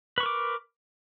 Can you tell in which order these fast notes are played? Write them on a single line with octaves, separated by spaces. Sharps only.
B4 C#6 A#4 D6